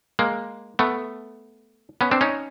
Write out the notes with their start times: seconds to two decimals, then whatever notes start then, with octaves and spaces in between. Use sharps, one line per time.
0.19 G#3 A#3
0.79 A3 B3
2.01 B3 C#4
2.11 C4 D4
2.21 C#4 D#4